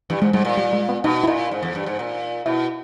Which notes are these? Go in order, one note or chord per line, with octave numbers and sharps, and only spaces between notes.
G2 E3
G#2 G#3
G#2 G3
A#2
G3
G#3
B3
B2 D#4
E4
A#2 D#4
G#2
E2
G2
G#2
A#2
B2 E4